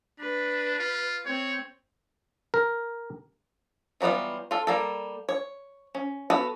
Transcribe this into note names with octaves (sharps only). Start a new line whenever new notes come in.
D4 B4
F4
C4 C#5
A#4
E3 F#3 G3 B3 F4
F4 A4
G3 A#3 A4
C#5
C#4
B3 F#4 A4 B4